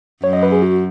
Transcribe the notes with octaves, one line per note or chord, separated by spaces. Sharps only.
F#2 C#5
D#5
B4
G#4
F#4